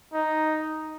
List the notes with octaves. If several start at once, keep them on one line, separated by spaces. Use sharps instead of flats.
D#4